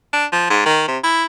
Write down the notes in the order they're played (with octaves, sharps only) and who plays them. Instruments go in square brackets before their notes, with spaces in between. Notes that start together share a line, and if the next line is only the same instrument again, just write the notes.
[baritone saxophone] D4
F3
G#2
D#3
C3
E4